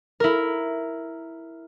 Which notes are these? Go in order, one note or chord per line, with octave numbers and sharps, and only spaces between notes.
E4 A#4